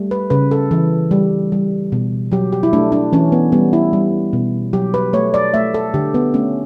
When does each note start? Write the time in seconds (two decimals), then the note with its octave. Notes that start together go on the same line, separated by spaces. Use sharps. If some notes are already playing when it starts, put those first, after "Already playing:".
Already playing: G3 A3
0.11 B4
0.30 C#3 B4
0.51 A4
0.71 E3
1.11 G3
1.52 G3
1.92 B2
2.32 F#3 G4
2.53 G4
2.63 E4
2.73 A3 D4
2.92 D4
3.13 E3 C#4
3.32 B3
3.52 G3 B3
3.73 E4
3.93 G3
4.33 B2
4.73 F#3 G4
4.94 B4
5.13 A3 C#5
5.34 D5
5.54 A3 E5
5.74 A4
5.94 D3 G4
6.14 B3
6.34 A3 C#4